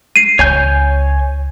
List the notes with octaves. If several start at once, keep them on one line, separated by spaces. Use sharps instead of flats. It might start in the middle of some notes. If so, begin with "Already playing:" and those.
C7 D#7
C#2 C#5 G#5 G6